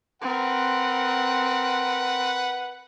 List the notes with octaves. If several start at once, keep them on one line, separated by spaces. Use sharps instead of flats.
C4 A#4 B4 F#5